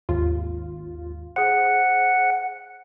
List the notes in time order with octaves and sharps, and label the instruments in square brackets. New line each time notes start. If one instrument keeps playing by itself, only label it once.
[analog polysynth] G#1 D#2 F4
[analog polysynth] G#4 C5 [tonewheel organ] F#5